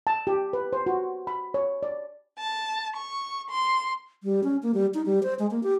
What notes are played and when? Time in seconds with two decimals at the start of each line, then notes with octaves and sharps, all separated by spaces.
0.07 A5
0.27 G4
0.53 B4
0.73 C5
0.86 F#4
1.27 B5
1.54 C#5
1.83 D5
2.38 A5
2.95 C#6
3.48 C6
4.23 G3
4.44 C#4
4.63 A#3
4.74 G3
4.94 D#4
5.06 G3
5.23 C5
5.39 G#3
5.51 A#3
5.63 G4